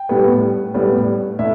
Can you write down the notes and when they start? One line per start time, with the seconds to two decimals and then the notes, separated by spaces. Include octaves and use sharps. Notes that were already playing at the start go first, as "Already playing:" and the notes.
Already playing: G5
0.09 A2 G3 B3
0.74 A2 G3 B3
1.39 A2 E5